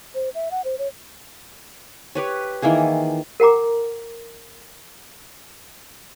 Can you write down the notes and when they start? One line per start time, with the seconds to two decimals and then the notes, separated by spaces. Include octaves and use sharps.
0.15 C5
0.35 E5
0.51 F#5
0.65 C5
0.78 C#5
2.15 G4 B4 C#5
2.62 D#3 E3 A#3 G#4
3.40 A#4 F#5 G5 A#5 D6